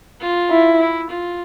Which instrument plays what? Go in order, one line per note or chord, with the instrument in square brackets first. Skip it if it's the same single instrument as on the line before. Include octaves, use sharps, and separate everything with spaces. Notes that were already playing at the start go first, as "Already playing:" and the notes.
[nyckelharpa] F4
[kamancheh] E4
[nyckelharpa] E4
F4